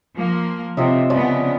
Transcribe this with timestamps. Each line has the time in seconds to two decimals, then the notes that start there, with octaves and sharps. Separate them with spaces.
0.15 F3 A#3
0.77 C3 F4 D#5 E5
1.10 C#3 F3 B3 D5